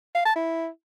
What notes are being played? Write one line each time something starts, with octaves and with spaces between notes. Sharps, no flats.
F5
A5
E4